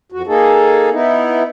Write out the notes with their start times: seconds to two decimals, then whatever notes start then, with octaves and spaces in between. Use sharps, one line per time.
0.12 F2 F#4
0.27 A#3 D#4 G#4 A4
0.91 B3 D#4 E4